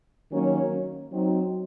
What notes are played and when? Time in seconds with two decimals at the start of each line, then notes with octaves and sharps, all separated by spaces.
0.31 D#3 F#3 A#3 C#4
1.11 F#3 C4 D#4